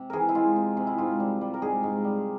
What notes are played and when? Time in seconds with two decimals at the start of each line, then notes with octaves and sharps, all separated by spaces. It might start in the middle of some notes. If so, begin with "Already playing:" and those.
Already playing: C3
0.10 E3 G#4 A#4
0.29 E4
0.35 G#3 F4
0.56 C3
0.77 C3
0.87 E4
0.98 G#2 F4
1.20 G3
1.41 G3
1.54 A#4
1.62 G#2 G#4
1.83 G#2
2.04 G3